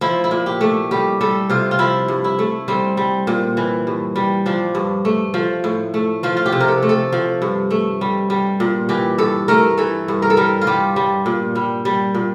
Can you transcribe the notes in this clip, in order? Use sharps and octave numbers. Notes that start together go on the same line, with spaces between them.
F3 E4
E4
A#2
G4
A3
G3 G4
G3 A4
C3 F4
F4
F3 E4
G2
E4
A3
G3 C4
G3
A#2
E3
G2
G3
F3 D4
G2
A3
F3
A2
A3
F3 F4
F4
G4
C3
A#4
A4
A3
A4
F3
G2
A3
G3
G3
A#2
E3 G4
G2 A4
A3 A#4
E3 A4
G2
A#4
A4
G3 A#4
F4
G3 G4
G3
A#2
G3
G3
A#2